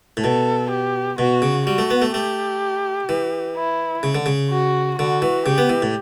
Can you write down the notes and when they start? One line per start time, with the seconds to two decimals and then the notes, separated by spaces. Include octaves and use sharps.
0.17 A2
0.24 B2 A4
0.71 G4
1.18 B2 F#4
1.42 C#3
1.67 G3 F#4
1.78 A3
1.91 B3
2.02 A3
2.14 A3 G4
3.09 E3
3.56 E4
4.03 C#3
4.15 D3
4.26 C#3
4.51 F#4
4.99 D3 F#4
5.22 E3
5.46 C#3 G4
5.58 B3
5.69 E3
5.82 A2